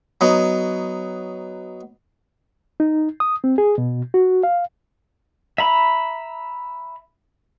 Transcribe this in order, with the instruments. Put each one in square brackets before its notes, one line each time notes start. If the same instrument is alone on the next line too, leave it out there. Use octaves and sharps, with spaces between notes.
[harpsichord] F#3 B3 D#4
[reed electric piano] D#4
D#6
C4
G#4
B2
F#4
F5
[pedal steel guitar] E5 A#5 B5